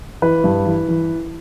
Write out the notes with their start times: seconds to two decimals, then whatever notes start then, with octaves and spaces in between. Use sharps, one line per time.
0.22 E3 B4
0.44 G2
0.66 E3
0.88 E3